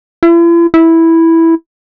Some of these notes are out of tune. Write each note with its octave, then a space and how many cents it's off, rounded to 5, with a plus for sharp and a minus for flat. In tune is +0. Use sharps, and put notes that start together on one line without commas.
E4 +45
E4 -5